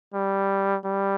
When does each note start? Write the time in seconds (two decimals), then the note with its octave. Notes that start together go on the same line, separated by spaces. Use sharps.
0.14 G3
0.85 G3